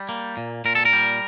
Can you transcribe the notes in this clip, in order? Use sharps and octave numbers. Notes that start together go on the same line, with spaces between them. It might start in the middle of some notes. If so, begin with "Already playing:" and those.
Already playing: G3
A#3
A#2
A#2 A#4
A4
A#4
G3